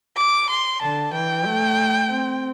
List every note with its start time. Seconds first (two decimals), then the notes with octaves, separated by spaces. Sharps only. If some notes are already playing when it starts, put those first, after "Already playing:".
0.17 D6
0.50 C6
0.82 D3 A5
1.13 E3 G5
1.45 A3
2.09 C4